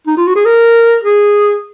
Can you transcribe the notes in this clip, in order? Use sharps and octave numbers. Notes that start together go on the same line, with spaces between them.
D#4
F4
F#4
G#4
A#4
G#4